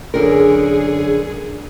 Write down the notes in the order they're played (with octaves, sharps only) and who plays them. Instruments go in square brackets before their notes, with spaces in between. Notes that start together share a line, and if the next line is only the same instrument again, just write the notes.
[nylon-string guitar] F#2 D3 A#4 [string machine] G#4